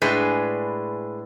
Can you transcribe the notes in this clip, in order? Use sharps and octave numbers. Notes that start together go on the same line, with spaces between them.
A2 G#3 D4 G#4 B4